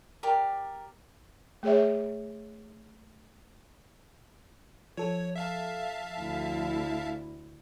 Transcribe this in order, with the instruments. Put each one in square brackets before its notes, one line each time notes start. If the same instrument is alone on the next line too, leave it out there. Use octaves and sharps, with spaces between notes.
[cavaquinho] G4 A#4 D5
[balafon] A3 G#4 C#5 E5
[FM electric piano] F3 A4 [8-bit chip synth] C#5
[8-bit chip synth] E5 F5 A5
[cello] D2 E4